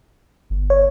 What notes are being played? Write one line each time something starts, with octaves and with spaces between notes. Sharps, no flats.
G1
C#5